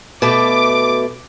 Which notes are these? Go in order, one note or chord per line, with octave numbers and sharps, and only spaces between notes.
B2 A3 D6